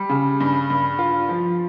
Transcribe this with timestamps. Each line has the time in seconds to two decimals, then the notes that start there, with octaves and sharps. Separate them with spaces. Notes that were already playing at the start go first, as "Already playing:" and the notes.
Already playing: G3
0.09 C#3
0.40 G2
0.70 G2
0.99 F4
1.29 F3